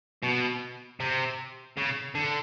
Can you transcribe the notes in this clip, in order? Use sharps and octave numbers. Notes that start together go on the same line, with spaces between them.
B2
C3
C#3
D3